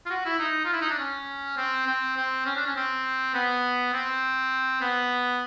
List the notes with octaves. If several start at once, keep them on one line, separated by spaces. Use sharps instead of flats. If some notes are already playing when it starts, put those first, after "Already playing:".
F4
F#4
E4
D#4
F4
E4
D#4
D4
C#4
C4
C4
C4
C#4
D4
C#4
C4
B3
C4
B3